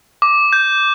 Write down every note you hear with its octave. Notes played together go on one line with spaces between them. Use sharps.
D6
G6